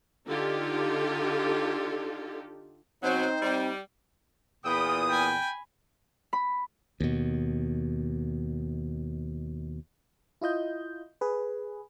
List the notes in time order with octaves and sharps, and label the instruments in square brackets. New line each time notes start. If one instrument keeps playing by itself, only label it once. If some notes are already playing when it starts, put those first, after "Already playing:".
[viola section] D3 D#4 F4 G4 A4
[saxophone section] B2 F#3 [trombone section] C4 D#4 [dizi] C5
[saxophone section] G3
[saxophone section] E2 A#2 [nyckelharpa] G5 B5 [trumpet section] D#6
[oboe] G5 [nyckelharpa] G#5 B5
[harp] B5
[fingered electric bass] D#2 B2
[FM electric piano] E4 F4 D#5 G6
G#4 B4